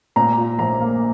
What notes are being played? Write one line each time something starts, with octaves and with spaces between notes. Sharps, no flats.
A#2 A#5
F4
A#1 A#5
A#3